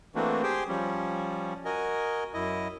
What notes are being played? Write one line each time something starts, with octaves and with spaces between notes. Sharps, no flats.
E3 A3 A#3 C4 D4 F#4
G4 G#4 C5 G5
F3 G3 C#4
F#4 A#4 D#5 G#5
F#2 E4 D#5